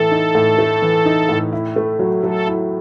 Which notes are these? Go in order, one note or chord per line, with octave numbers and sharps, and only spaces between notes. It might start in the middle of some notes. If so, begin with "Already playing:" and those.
Already playing: A2 E3 A3 A4
D#4
A2
A3
E3
D#4
A2
E4
A3
F#3
F#3 A4
E4